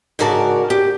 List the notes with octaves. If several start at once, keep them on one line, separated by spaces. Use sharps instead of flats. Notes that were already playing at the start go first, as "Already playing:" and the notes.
G#2 C#3 F#4 A#4 D5 A5
G4